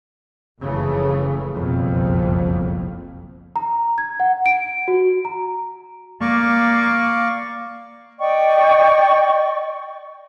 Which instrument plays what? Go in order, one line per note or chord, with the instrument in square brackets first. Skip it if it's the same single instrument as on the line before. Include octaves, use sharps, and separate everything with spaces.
[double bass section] F#1 F2 C#3 E3 A3
F#1 C2 F2 B2
[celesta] A#5
G#6
F#5
D7
F#4
A#5
[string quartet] A#3 [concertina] D5 F5 C#6
[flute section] D5 D#5 G5 C#6